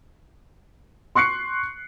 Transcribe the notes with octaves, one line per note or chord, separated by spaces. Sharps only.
C6 C#6 F#6 C7 C#7